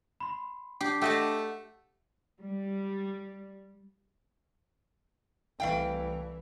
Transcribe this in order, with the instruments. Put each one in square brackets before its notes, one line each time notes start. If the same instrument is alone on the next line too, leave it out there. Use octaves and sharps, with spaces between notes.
[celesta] B5 C6
[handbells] D4 D6 C7 [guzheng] G4
[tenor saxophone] A3 [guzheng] G4 D#5 A5 [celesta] F#5
[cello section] G3
[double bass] C2 E3 [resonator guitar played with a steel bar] A3 F5 G5